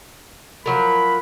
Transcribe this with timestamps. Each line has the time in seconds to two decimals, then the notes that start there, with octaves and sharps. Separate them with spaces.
0.66 F3 F#3 A#4 B5